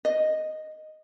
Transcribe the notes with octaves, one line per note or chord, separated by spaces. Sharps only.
D#5